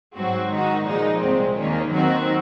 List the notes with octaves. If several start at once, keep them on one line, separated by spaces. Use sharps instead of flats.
G#2 F#3 C4 F#4
D#3 G#3 D#4 F#4
A#2 F3 G#3 D#4
C2 A#2 G#3 C4
D#2 D#3 A#3 C#4
D#3 F#3 C4 F#4